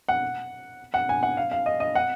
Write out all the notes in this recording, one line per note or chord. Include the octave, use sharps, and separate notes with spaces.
F#5
F#5
G#5
F#5
F5
F5
D#5
D#5
F#5